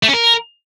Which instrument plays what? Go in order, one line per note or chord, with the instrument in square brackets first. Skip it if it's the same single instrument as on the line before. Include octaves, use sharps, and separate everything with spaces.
[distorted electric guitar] A3
C#4
A#4